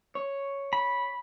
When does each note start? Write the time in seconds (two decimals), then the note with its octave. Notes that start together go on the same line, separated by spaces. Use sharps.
0.15 C#5
0.73 B5